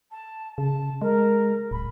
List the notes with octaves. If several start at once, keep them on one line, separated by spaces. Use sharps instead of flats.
A5
C#3 A5
G#3 A#4
D1 B5